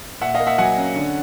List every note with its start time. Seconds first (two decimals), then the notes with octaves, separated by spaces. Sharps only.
0.21 A#2 E5 F#5
0.34 D#5 F5
0.40 A#3
0.47 E5 F#5
0.58 F#3 F#5 G#5
0.77 C#4
0.96 D3